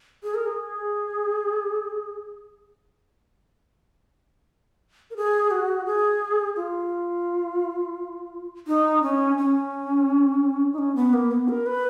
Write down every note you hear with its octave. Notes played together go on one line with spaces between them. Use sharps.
G#4
A#4
G#4
A#4
G#4
F#4
G#4
F4
D#4
C#4
C#4
D#4
C#4
B3
A#3
B3
A#4
B4